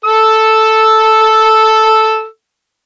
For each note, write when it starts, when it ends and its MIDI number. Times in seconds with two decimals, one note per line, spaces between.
0.05 2.25 69
0.05 2.25 88